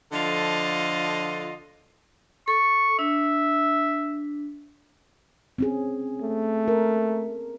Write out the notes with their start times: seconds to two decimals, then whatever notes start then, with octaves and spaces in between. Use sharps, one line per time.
0.12 D3 F3 F4 A4 D#5
2.48 A4 C#6
2.99 D4 E5
5.58 C4 C#4 G#4
6.22 A3
6.68 A#4